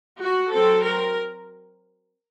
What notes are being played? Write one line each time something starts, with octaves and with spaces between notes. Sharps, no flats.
F#4
F#3 C4 A4
A#4